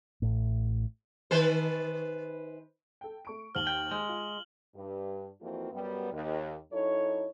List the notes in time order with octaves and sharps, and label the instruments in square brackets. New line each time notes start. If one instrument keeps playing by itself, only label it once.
[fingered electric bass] A1 A2
[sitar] D#3 B4 C5
[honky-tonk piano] A4 G5
A3 C#6 D7
[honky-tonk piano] D#2 C5 [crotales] F6 F#7 G7
[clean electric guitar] G5
G#3
[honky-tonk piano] F4
[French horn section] G2
F2 E3 A#3 C4 F4 F#4
F#2 G3 B3
D#2
F#2 D#4 E4 A4 C#5